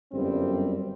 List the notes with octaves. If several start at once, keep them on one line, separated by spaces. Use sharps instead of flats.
G1 F#2 G3 C4